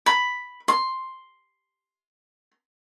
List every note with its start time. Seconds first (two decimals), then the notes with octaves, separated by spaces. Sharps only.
0.06 B5
0.68 C6